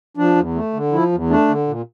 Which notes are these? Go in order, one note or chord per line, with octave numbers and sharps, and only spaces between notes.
F3 D4
E2
A3
D3
F3 E4
E2
A3 D4
D3
A#2